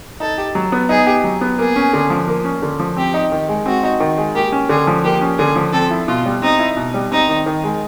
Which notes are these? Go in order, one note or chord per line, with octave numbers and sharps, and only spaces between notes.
D#4 A4
G4
F#3
B3
D#4 G#4
G4
F#3
B3
A#3 G#4
C#4
D3
F3
A#3
C#4
D3
F3
C4 G4
D#4
D#3
G#3
C4 F#4
D#4
D#3
G#3
A#3 G4
C#4
D3 G#4
F3
A#3 G4
C#4
D3 G#4
F3
C4 A4
E4
B2 F4
G3
C4 D#4
E4
B2
G3
C4 D#4
D#3
D#3
G#3